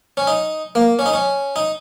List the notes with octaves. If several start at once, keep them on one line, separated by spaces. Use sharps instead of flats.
C#4
D#4
A#3
C#4
D#4
C#4
D#4